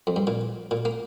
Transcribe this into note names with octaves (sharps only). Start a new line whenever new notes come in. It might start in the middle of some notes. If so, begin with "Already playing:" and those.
F2
G2
A#2
A#2
A#3